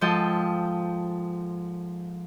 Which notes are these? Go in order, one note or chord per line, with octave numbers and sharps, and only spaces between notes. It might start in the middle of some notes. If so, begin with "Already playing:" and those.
G#2 F3 A4 D#5 G5 G6